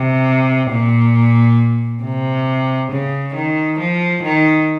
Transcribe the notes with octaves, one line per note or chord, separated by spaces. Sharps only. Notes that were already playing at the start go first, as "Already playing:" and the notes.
Already playing: C3
A#2
C3
C#3
D#3
F3
D#3